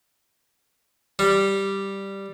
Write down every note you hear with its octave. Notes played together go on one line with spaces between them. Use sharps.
G3